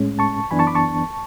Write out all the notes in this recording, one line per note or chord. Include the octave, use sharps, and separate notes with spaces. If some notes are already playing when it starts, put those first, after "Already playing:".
Already playing: A2 G#3 C#4
A5 C#6
F#2 E3 B3 D4 G#5 B5
A5 C#6
B5 D6
A5 C#6